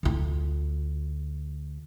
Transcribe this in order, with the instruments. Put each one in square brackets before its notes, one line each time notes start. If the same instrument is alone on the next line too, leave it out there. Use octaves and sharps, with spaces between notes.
[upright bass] D2 F4